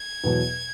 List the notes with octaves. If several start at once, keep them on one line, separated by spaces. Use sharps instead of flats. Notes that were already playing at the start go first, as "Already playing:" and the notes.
Already playing: G#6
E2 B2 F#3